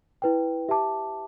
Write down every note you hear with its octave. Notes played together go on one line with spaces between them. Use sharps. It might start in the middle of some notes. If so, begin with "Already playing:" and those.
E4 B4 G5
G4 E5 A5 D6